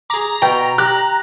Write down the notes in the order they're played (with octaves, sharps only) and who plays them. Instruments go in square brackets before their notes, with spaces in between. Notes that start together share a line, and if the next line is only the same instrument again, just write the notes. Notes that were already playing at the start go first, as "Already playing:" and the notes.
[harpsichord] G#4 D6 [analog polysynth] A#5
[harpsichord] B2 [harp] G5
[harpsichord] G4 [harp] F#6